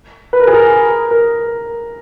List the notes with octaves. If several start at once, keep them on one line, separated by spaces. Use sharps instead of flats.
B4
A#4
G#4
A#4
A#4